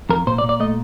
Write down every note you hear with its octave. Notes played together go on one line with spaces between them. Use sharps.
F2 A#4
A#2 C5
D5
A#2
D5
A3 D#5